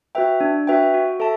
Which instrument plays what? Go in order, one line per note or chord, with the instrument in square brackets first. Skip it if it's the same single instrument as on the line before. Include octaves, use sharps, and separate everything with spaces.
[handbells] F#4 B4 E5 G5
D4
F#4 B4 E5 G5
F#4
A4 E5 A5